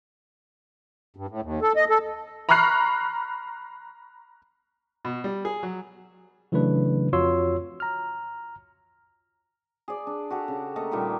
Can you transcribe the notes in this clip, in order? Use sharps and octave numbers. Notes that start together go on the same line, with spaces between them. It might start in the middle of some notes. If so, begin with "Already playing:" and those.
G2
A2
D#2
A4
D#5
A4
A#5 B5 C#6 F6 F#6 C7
B2
G3
G#4
F#3
C#3 E3 F#3 A3 D4 B4
F2 F4 F#4 C#5 C6 E6
A#5 F6
G#4 D5
D4
F#4 G4 A4
C#3
A3 A#3 A4 D#5
A#2 D#3 G3 A3